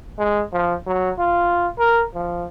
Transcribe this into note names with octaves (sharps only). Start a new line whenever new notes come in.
G#3
F3
F#3
F4
A#4
F3